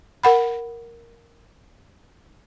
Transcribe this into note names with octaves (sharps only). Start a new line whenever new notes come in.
A#4 F#5 B5